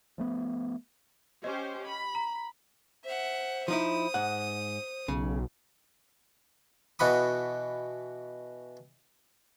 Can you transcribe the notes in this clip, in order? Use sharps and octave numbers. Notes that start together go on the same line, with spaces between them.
F3 A3 B3
C#4 G4 C5 D#5
B5
A#5
C5 E5 F#5
F3 D#4 E4 D#6
G#2 F#5
B1 C#3
B2 E3 F#4 B5 D#6